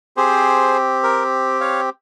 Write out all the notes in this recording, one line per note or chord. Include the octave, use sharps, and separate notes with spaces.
C4 G4 G#4 C5
A#4
C#5 F5